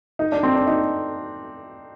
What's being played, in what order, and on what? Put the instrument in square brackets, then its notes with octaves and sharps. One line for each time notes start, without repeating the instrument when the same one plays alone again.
[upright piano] D#4
D4
C4
D4
D#4